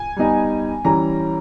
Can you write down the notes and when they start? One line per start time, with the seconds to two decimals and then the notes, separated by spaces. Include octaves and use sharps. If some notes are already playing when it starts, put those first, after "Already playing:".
Already playing: G#5
0.16 G3 B3 D#4
0.85 E3 G3 C#4 A#5